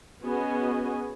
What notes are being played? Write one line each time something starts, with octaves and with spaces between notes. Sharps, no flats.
B3 C#4 F#4 G#4 D#5 G#5